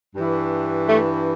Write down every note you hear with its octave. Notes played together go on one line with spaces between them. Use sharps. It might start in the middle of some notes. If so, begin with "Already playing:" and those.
G2 E3
A3